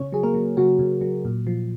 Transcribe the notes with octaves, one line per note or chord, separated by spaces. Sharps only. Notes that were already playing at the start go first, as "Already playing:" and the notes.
Already playing: C#3 C#4 C#5
F#3 G#4
A#3 A#4
F#3
C#3 F#3 F#4
C#3
F#3
A#2
F3